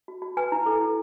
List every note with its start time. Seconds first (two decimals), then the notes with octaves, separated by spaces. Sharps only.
0.08 F#4
0.22 F#4
0.37 B4 G#5
0.52 E4
0.66 A4
0.81 E4